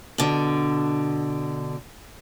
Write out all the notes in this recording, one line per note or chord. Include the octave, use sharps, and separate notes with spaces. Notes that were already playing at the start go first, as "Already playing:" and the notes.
B2 D3